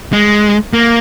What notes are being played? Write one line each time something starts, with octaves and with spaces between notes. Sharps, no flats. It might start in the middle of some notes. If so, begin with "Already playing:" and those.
G#3
A#3